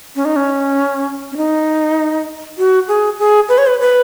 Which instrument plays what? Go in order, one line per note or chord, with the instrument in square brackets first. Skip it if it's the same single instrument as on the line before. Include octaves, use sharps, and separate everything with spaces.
[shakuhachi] C#4
D#4
C#4
C#4
D#4
F#4
G#4
G#4
B4
C#5
B4
B4